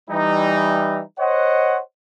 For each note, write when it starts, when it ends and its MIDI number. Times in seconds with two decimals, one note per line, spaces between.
0.10 1.02 52
0.10 1.02 55
0.10 1.02 63
1.20 1.80 72
1.20 1.80 73
1.20 1.80 75
1.20 1.80 78